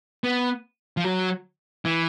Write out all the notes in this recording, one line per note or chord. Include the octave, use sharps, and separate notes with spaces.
B3
F3
F#3
E3